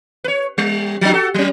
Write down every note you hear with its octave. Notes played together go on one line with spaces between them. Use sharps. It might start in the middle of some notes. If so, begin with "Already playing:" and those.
B4 C#5
G3
F3 D4
F#4 A4
F#3 C#4